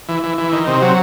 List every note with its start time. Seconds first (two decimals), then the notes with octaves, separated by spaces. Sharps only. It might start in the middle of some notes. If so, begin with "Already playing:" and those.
0.09 E3
0.23 E3
0.38 E3
0.52 D#3
0.67 C3
0.82 F#3